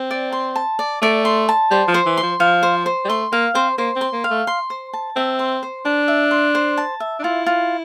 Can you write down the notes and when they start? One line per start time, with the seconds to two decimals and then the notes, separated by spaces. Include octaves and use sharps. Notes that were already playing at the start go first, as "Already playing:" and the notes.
Already playing: C4
0.11 D5
0.32 C6
0.56 A5
0.79 D5
1.02 A3 D5
1.25 C6
1.49 A5
1.71 G3 C5
1.88 F3
1.94 C5
2.06 E3
2.17 C6
2.23 F3
2.40 F3 F5
2.63 C5
2.86 C5
3.05 G3
3.09 A3 C6
3.32 A#3 F5
3.55 C4 C5
3.78 A#3 C5
3.96 C4
4.01 C6
4.13 A#3
4.24 F5
4.31 A3
4.47 C6
4.70 C5
4.93 A5
5.16 C4 E5
5.39 C6
5.63 C5
5.85 D4 A5
6.08 E5
6.31 C6
6.55 C5
6.77 A5
7.00 E5
7.19 D4
7.24 E4 F4
7.46 F4